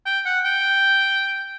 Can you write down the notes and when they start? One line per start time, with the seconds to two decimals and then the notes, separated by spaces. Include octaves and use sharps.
0.06 G5
0.25 F#5
0.44 G5